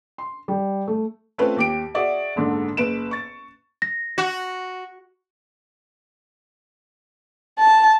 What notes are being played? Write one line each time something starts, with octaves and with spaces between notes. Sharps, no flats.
C6
G3
A3
A3 C4 C#4 F4 B4
D#2 G4 D7
F#4 G#4 D5 E5
F#1 G#2 D3 D4
F#1 B4 D7 E7
C#6 A6
A#6
F#4
A5